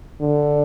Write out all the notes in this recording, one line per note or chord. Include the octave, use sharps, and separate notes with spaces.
D3